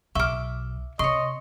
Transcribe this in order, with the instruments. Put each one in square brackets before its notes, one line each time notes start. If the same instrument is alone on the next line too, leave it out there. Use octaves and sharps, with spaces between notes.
[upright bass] B1 [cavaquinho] E5 D6 [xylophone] C#6 F6
[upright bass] C3 [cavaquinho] C#5 C6 [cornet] D#5 [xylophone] C#6